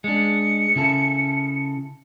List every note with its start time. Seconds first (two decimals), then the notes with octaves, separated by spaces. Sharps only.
0.04 G#3 D4 C#7
0.76 C#3 E4 A4